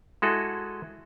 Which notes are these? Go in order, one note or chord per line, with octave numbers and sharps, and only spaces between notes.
G#3 E4 F#4 G#4 A4